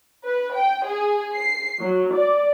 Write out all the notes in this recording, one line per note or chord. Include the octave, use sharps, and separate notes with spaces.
B4
G5
G#4
C7
F#3
D5